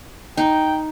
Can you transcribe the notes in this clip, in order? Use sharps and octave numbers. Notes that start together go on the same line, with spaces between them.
D#4 G5